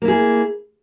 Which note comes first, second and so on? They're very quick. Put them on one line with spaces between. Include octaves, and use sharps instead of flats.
A#3 E4 G#4